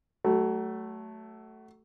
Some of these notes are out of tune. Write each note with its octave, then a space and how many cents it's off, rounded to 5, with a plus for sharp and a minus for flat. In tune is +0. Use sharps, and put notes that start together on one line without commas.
F#3 +30 A3 +0